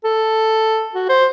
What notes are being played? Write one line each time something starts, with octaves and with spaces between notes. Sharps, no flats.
A4
F#4
C5